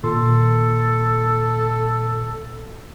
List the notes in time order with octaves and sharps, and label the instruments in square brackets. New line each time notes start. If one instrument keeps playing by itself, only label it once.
[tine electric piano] A#2 D#3 C6 [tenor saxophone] A4